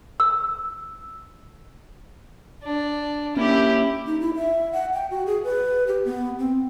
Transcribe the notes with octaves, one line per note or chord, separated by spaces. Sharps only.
E6
D4
A#3 C#4 E4 G4
D#4
E4
E5
F#5
G5
F#4
G#4
B4
G4
B3
C4